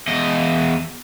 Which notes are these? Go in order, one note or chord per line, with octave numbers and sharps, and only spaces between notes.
E2 D#5